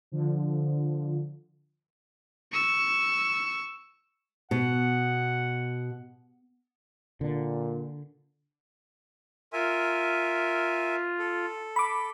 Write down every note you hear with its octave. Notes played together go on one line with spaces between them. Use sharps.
D3 F3
C#6 E6
B2 F#5
A#2 D3
F4 A#4 E5 G#5
A4
B5 D6